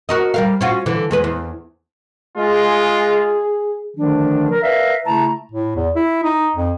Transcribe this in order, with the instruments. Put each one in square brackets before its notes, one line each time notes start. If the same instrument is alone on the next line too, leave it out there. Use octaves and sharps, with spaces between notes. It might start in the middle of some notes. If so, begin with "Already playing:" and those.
[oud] F#4 A#4 D#5
G3 A#4 F5
C#4 F4 F#4
D3 E3
E2 G#3 B4
E2
[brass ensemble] G#3 F4 [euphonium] G#4
[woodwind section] D3 D#3 F3 A3 D4
A#4
A#4 B4 D5 E5 F5
C#3 A3 E4 A5 A#5
[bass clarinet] A2
E2
E4
D#4
F2